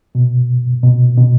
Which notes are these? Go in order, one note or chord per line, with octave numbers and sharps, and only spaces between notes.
B2
B2
B2